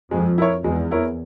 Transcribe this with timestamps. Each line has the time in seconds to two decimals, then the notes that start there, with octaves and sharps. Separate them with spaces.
0.11 F2 G#3
0.38 E4 A#4 C#5
0.64 E2 G#3
0.91 E4 A#4 C#5